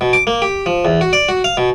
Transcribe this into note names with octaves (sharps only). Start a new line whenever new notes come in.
B2
D6
A#3
G4
F3
E2
F#4
D5
F#4
F5
B2